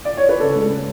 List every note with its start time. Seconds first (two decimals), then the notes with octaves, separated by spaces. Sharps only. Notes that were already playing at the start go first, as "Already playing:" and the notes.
0.05 D5
0.17 C#5
0.29 B4
0.40 C#3 A4
0.55 G#3
0.71 G#3